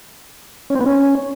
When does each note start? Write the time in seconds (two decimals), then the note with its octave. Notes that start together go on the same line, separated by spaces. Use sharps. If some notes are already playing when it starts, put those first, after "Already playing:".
0.70 C#4
0.75 C4
0.81 B3
0.86 C#4